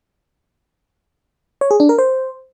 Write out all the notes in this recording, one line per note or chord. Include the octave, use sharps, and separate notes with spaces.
C#5
G#4
D4
A#4
C5